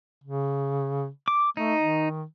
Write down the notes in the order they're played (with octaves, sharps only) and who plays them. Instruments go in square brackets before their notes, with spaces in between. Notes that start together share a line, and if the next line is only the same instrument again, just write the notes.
[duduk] C#3
[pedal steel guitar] D6
[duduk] A3 [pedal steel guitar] D#4
[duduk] D#3